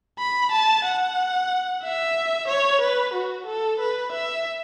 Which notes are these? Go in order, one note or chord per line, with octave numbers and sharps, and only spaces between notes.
B5
A5
F#5
E5
C#5
B4
F#4
A4
B4
E5